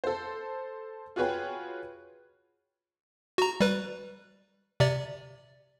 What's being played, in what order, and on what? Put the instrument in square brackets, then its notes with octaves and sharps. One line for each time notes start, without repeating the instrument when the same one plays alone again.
[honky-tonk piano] A4 C5
F4 F#4 G#4 B4 C#5 G5
[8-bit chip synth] F#4 A#5
G3 B4
C3 D5